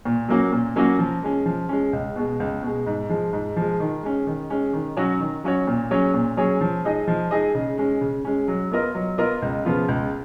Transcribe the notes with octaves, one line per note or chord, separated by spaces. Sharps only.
A#2
F#3 A#3 C#4 F#4
A#2
F#3 A#3 C#4 F#4
F3
G#3 C#4
F3
G#3 C#4
C#2
B2 G#3
C#2
B2 G#3
G#2
F3 G#3
G#2
F3 G#3
D#3
G#3 C#4
D#3
G#3 C#4
D#3
F#3 C#4 F#4 C#5
D#3
F#3 C#4 F#4 C#5
A#2
F#3 C#4 G#4 C#5
A#2
F#3 C#4 G#4 C#5
F3
G#3 D#4 G#4 D#5
F3
G#3 D#4 G#4 D#5
C#3
G#3 C#4
C#3
G#3 C#4
F#3
B3 F4 A#4 D#5
F#3
B3 F4 A#4 D#5
C#2
C#3 F3 B3 F4
C#2